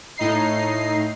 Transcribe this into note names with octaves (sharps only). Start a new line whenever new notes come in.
A2 D#4 C7